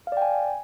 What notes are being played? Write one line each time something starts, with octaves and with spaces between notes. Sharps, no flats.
D5 F5 G5 G#5